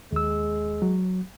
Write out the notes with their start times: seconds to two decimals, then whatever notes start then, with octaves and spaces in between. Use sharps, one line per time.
0.12 D#2 G#3 E6
0.82 F#3